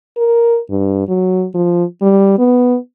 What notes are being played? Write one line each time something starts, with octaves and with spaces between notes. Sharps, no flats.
A#4
G2
F#3
F3
G3
B3